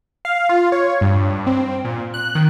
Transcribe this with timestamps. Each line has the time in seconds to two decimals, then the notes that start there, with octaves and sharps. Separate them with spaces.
0.25 F5
0.49 F4
0.72 C#5
1.01 G2
1.47 C4
1.85 A#2
2.14 F#6
2.35 D#3